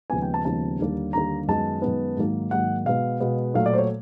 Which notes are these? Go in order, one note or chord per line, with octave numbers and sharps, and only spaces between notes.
D#2 C#3 F3 G#3 B3 G#5
G5
A5
D#2 C#3 F3 G#3 B3 A5
D#2 D3 G3 A#3
D#2 D3 G3 A#3 A#5
F#2 D#3 G#3 B3 A5
F#2 D#3 G#3 B3
G#2 D#3 F#3 A#3
G#2 D#3 F#3 A#3 F#5
B2 G#3 B3 F5
B2 G#3 B3
A#2 F#3 A3 F5
D5
C5
C#5